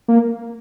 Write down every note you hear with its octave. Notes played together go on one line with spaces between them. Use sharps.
A#3